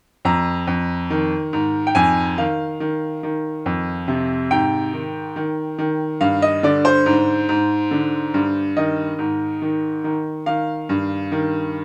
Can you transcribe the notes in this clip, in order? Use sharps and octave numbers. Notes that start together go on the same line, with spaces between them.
F2 A#5
F2
D#3
G#2
G5
F2 G#5
D#3 F5
D#3
D#3
F2
C3
G#2 G5
D#3
D#3
D#3
G2 F5
D#5
D3 D5
C5
G#2
G#2
D3
G2
D#3 D#5
G#2
D#3
D#3
D#3 F5
G2
D#3